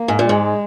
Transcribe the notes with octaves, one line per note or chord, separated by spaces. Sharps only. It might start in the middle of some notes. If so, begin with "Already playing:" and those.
Already playing: A#3
G#2
A#2
G#2 G#3